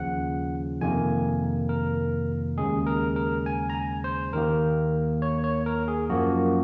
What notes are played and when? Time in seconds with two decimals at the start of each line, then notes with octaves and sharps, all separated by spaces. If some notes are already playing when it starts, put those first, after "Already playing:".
Already playing: D#2 C#3 F3 F#5
0.81 F2 C3 D#3 A#3 G#5
1.69 A#4
2.58 D#2 C#3 G#3 G#4
2.87 A#4
3.16 A#4
3.46 G#5
3.70 A#5
3.75 G#5
4.04 C5
4.33 D#2 D#3 A#3 A#4
5.22 C#5
5.44 C#5
5.66 A#4
5.88 G#4
6.10 F#2 F3 A#3 F#4